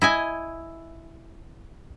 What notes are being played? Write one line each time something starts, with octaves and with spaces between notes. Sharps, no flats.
E4 D#5 G#5